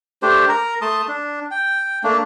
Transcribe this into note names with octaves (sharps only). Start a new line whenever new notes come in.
A3 D4 G4 C5
A#4 A#5
A3 A5 C6 D#6
D4
G5
A3 A#3 D4